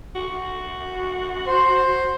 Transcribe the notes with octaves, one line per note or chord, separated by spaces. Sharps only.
F#4
C5